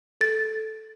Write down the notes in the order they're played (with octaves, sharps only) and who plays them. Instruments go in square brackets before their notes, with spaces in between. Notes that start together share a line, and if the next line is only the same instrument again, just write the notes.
[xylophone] A4 A6